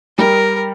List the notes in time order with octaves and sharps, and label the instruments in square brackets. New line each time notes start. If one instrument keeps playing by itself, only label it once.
[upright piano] G3 [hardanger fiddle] A#4